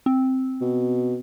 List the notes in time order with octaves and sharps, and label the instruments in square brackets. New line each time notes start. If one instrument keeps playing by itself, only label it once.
[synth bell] C4
[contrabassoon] B2